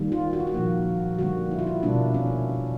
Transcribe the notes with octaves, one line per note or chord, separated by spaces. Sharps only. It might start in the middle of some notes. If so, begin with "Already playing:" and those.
Already playing: D#3 G3 A#3
F4
F#4
F4
F#4
A#2 F3 A#3
D3 G3 A#3 F#4
E4
F4
E4
B2 G3 A#3 D4
C#4